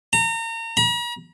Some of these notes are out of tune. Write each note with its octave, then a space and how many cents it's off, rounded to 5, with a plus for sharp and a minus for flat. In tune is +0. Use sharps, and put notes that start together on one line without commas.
A#5 -35
A#5 +45